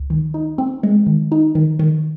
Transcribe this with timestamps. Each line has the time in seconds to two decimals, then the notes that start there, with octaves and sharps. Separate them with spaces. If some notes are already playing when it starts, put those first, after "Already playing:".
Already playing: C#2
0.10 D#3
0.34 D#4
0.58 C4
0.83 G#3
1.07 D#3
1.32 D#4
1.55 D#3
1.79 D#3